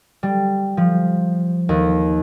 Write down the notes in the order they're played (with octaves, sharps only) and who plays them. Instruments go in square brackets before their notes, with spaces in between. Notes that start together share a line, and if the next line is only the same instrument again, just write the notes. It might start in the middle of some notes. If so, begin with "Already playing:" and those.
[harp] G3
F3
D#2